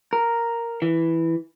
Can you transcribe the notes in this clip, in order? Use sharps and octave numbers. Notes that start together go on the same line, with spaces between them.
A#4
E3